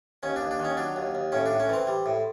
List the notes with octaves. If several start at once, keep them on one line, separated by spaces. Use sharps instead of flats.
D#2 C#4
D4
D#2
D4
D#3
C#4
F#3 D4
D#2
D#2
A2 C#4
D4
A2
C#4
E3 C4
G3
A2